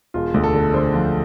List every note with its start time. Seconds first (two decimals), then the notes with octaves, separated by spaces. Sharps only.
0.14 E1 F4
0.34 D2
0.43 A4
0.54 D3
0.74 D3 C5
0.94 F3